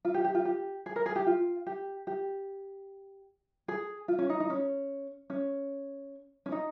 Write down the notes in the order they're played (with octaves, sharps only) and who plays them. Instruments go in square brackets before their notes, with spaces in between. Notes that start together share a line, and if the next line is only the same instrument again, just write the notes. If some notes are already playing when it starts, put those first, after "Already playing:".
[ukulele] F4
G4
G4
F4
G4
G#4
A#4
G#4
G4
F4
G4
G4
G#4
F4
C#4
D#4
D#4
C#4
C#4
C#4
D#4